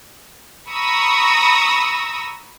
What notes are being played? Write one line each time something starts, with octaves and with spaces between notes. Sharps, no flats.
A#5 B5 C#6 D#6 E6 A#6